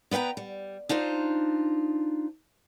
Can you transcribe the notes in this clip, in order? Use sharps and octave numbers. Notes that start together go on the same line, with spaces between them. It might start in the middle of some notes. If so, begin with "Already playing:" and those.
B3 B4 F5 G5 A#5
G3
D4 D#4 F4 C5